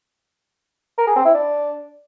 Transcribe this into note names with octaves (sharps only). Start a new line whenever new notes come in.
A#4
G#4
C4
E4
D4